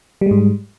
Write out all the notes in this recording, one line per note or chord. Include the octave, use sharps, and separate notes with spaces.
G#2 G3 G#3